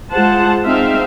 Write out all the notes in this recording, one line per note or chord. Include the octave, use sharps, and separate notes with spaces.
G#3 F4 G#4 C5 F#5 A5
G#3 C4 D#4 E5 F5